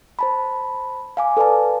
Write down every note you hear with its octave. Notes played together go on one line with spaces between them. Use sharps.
C5 A5 B5
F5 G#5 D6
A4 B4 D5 F5 A5